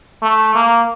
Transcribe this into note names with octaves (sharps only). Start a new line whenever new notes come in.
A3
A#3